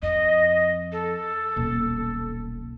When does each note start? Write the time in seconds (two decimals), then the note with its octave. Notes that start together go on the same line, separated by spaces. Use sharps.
0.02 F2 D#5
0.92 A4
1.56 D#1 B1